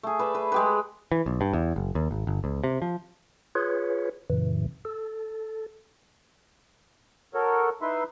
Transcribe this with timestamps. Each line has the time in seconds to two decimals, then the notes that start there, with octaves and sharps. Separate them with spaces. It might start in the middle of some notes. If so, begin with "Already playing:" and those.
0.03 A3 G#4
0.19 B4 D5 E5
0.35 B4
0.52 G#3 G4 B4
1.12 E3
1.26 B1
1.41 G2
1.53 E2
1.76 F#1
1.95 D#2
2.11 G#1
2.27 G1
2.44 C#2
2.64 C3
2.82 F3
3.55 F4 G#4 B4 C#5
4.30 F#2 A#2 C#3 E3
4.85 A4
7.34 F#4 A4 A#4 C#5
7.82 D#4 E4 B4 E5 C6